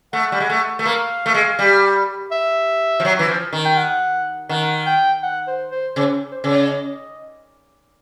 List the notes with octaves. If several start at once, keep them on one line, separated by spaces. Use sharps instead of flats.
A3 F#5
G3
G#3
A3
A3
A#3 F5
A3
G#3
G3
E5
F3
F#3
E3
F3
D#3
G5
F#5
D#3 F#5
G5
F#5
C5
C5
C#3 C5
C5
C#3
D5
D#5